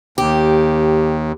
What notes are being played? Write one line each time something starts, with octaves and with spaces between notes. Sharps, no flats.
D#2 G4